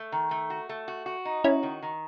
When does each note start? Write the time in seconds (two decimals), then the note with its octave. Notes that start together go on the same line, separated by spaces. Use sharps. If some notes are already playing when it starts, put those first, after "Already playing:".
Already playing: A3
0.12 D#3
0.31 A3
0.50 F#4
0.69 A3
0.88 F#4
1.06 F#4
1.25 D#4
1.44 C#4 E4 F#4
1.63 D#3
1.82 D#3